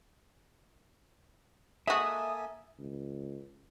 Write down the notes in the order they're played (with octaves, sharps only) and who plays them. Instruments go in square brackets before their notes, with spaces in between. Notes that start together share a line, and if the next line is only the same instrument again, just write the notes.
[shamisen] G#3 F#4 [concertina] A#3 A4 G#5 [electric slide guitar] E5 [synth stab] D#6
[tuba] C#2